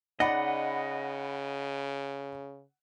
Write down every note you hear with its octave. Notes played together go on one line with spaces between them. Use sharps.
C#3 D#4 D5 D#5 F#5 B5